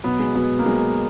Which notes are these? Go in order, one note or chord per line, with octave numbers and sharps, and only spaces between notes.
B2 F#3 B3
G#3
B2 F#3 B3
A#3
B2 F#3 G#3